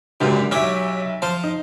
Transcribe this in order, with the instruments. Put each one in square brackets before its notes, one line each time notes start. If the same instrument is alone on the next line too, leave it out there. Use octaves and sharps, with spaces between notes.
[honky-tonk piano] G#1 D3 G4 [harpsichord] C#2 F#2 A#2
[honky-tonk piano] B1 E5 [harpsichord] F#3 G4 C#5
[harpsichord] F3 F4 C5 [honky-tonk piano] A5
[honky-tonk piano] D#4